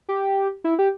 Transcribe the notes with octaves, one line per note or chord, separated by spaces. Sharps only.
G4
E4
G4